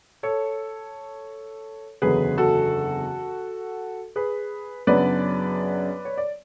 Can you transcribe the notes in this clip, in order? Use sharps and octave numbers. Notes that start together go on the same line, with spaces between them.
A4 C#5
F#1 E2 D3 F#3 G#4 B4
F#4 A4
G#4 B4
F#2 C#3 F#3 B3 D4 B4 D5
C#5
D5